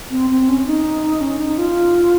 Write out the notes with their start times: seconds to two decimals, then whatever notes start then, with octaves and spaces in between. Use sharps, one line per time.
0.11 C4
0.30 C4
0.48 C#4
0.67 D#4
1.21 C#4
1.39 D#4
1.58 F4